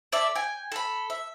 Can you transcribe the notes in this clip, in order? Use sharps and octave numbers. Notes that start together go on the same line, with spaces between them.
A4 D5 E5
G5 G#5
A4 B5
E5